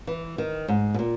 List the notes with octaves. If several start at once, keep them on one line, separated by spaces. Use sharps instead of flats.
E3
D#3
G#2
B2
A#2